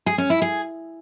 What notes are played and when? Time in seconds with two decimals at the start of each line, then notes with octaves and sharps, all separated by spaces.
0.06 G#4
0.18 C#4
0.30 E4
0.42 G#4